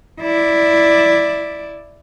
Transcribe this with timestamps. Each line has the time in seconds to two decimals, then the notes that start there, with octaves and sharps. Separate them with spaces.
0.21 E4 D5